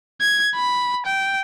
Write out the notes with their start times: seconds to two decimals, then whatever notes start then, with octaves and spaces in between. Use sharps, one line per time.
0.21 G#6
0.56 B5
1.06 G5